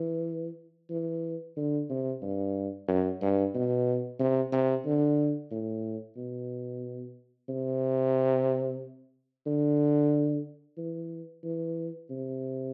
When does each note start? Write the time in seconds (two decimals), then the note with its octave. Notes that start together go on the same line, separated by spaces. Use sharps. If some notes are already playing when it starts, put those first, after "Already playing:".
Already playing: E3
0.90 E3
1.57 D3
1.90 C3
2.22 G2
2.88 F#2
3.22 G2
3.54 B2
4.19 C3
4.52 C3
4.86 D3
5.51 A2
6.17 B2
7.49 C3
9.46 D3
10.77 E3
11.44 E3
12.10 C3